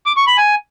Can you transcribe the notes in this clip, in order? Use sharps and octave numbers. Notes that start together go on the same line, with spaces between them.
D6
C#6
B5
G#5